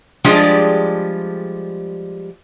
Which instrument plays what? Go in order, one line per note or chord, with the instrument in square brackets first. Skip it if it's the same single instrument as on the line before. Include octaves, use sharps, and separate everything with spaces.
[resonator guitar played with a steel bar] F3 G3 G#3 D4 G4 G#4